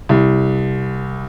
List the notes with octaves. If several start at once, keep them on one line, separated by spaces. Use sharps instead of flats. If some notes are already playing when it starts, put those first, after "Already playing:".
C2